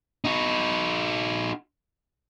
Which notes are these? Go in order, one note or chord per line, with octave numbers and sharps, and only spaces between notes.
D#4 F#4